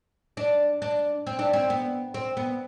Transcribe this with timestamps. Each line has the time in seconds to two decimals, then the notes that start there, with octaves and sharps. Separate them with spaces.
0.37 D4
0.82 D4
1.27 C4
1.39 D4
1.53 C4
1.70 B3
2.14 C4
2.37 B3